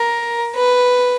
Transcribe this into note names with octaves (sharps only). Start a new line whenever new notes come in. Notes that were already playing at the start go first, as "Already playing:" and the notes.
Already playing: A#4
B4